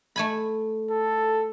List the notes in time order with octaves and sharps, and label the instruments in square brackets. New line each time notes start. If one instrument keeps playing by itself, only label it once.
[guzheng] A3 G#5 B5
[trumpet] A4